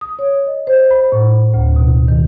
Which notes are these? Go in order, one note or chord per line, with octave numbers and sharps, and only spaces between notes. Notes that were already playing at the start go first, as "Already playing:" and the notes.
D#6
C#5
D#5
C5
B5
A2
D2
B2
D#3